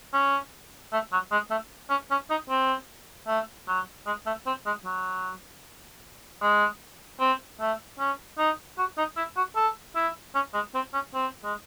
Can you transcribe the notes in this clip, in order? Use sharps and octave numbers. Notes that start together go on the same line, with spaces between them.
C#4
A3
F#3
G#3
A3
C#4
C#4
D#4
C4
A3
F#3
G#3
A3
C4
G#3
F#3
G#3
C4
A3
C#4
D#4
F#4
D#4
E4
F#4
A4
E4
C#4
G#3
C4
C#4
C4
G#3